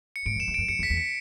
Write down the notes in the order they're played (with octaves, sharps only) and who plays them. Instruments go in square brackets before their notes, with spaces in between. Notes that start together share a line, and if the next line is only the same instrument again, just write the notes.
[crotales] C#7
[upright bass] G#2 [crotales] D7
[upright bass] F#2
[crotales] E7
[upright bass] E2
[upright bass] F#2 [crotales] D7
[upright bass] F#2 [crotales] C#7
[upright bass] E2
[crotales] B6
[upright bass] E2
[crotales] C#7